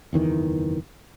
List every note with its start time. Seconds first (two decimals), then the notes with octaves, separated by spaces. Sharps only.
0.13 F#1 E2 D#3 E3